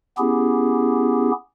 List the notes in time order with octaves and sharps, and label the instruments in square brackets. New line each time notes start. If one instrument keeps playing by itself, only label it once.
[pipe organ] B3 C#4 E4 G4 G#4